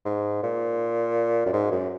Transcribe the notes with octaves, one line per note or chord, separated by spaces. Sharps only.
G#2
A#2
F#2
G#2
F#2